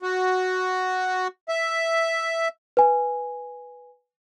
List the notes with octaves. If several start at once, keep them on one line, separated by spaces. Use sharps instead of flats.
F#4
E5
B4 G#5